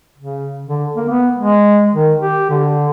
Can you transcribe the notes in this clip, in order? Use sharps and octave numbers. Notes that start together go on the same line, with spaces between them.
C#3
D3
A#3
B3
G#3
D#3
G4
D3